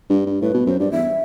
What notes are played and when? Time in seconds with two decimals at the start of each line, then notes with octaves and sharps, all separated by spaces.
0.10 G2
0.26 G2
0.42 A2 B4
0.54 B2
0.66 F#2 C5
0.79 G2 D5
0.92 E2 E5